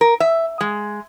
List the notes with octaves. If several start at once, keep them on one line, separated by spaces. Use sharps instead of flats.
A#4
E5
G#3